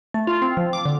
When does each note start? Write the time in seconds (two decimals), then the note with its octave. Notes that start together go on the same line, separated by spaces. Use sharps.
0.14 A3
0.27 F4
0.42 C4
0.57 F3
0.73 D6
0.85 D3